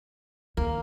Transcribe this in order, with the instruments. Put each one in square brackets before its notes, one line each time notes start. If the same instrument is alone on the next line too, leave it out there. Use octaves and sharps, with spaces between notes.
[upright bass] D#2 [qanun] A#3